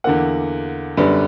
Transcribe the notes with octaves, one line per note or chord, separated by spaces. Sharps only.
E2 D3 A#3 F#5
F#2 D3 G3 B3 B4